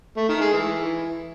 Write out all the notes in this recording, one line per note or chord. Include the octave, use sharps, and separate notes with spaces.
A3
D#3
G#3
E3